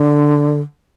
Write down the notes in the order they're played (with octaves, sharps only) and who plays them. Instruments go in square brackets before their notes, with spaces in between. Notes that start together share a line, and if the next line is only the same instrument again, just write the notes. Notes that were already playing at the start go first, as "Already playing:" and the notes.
Already playing: [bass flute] D3